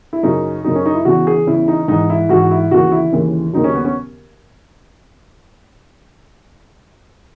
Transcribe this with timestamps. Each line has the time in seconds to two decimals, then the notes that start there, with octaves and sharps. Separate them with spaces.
0.13 E4
0.23 F#2 C#3 F#3 D#4
0.64 F#2 C#3 F#3 D#4
0.75 C#4
0.86 D#4
0.95 E4
1.05 E2 C#3 E3 F#4
1.27 G#4
1.46 E2 C#3 E3 E4
1.68 D#4
1.88 G#2 E3 D#4
2.10 E4
2.29 G#2 E3 F#4
2.51 E4
2.71 D#2 C#3 E3 F#4
2.92 E4
3.12 D#2 C#3 E3
3.53 D#2 C#3 F#3 D#4
3.64 C#4
3.75 B3
3.85 C#4